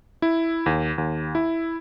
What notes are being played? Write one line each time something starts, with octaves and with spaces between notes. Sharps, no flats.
E4
D#2
D#2
E4